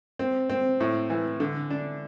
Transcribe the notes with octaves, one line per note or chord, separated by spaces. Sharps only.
C4
C4
A2
E3
D3
D4